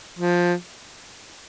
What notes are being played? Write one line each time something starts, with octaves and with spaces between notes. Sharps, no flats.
F3